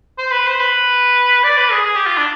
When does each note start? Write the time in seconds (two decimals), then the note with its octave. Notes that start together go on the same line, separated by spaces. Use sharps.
0.18 C5
0.31 B4
0.46 C5
0.60 B4
1.43 D5
1.57 B4
1.72 G#4
1.85 G#4
1.95 G4
2.06 F4
2.17 D4